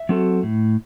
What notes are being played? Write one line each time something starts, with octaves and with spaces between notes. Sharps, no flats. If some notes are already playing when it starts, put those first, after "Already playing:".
Already playing: E5
F#3 C4 F#4 A4
A2